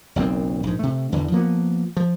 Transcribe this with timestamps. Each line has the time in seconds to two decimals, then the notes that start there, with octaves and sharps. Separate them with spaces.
0.16 F#1 B1 F#2 C4
0.63 A#1 G#2
0.79 C3 A3
1.12 E2 D3 E3
1.32 F3 A#3 B3
1.97 F3